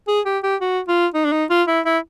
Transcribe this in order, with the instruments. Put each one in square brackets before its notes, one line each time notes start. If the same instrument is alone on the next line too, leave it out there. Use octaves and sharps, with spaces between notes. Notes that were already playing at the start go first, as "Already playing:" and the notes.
[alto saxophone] G#4
G4
G4
F#4
F4
D#4
D4
D#4
F4
E4
E4